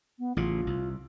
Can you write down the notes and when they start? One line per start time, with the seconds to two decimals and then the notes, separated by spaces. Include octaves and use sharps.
0.19 B3
0.37 A1 C#3 F4
0.67 C2